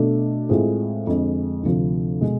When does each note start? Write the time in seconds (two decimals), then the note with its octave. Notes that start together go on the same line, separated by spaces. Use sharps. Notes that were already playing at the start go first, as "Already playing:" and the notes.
Already playing: B2 A3 D4 A4
0.49 A2 G#3 C4 F4 G#4
1.07 F2 D3 G#3
1.63 D2 C3 F3
2.21 B2 G#3